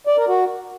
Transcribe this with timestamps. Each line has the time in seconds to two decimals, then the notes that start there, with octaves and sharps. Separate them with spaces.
0.07 D5
0.17 A#4
0.28 F#4